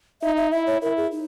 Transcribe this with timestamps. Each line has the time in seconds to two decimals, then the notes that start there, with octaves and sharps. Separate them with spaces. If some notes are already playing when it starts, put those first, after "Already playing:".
0.22 D#4 E5
0.37 E5
0.52 E4 E5
0.67 C#5
0.82 E4 A#4
0.97 G#4
1.12 D#4